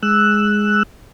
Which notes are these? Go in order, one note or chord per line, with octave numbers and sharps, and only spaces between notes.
G#3 E6 F#6